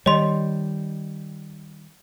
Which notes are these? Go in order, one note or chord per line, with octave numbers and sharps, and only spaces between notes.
D#3 G3 C#5 D#5 C6